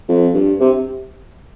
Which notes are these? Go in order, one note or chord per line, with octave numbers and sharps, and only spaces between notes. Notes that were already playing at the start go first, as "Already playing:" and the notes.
F2
G2
C3